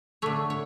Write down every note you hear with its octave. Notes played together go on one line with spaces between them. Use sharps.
D3 A3 C#5
C#5